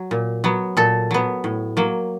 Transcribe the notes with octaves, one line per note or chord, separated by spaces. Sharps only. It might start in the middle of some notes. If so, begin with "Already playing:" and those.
Already playing: F#3
A#2
F#3 B3
A#2 A4
F#3 B3
A2
F#3 A#3